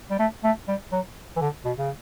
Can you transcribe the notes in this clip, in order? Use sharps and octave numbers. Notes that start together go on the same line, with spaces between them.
G3
A3
A3
G3
F#3
E3
D3
B2
C#3